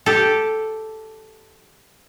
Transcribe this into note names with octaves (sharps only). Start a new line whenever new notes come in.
G4 A4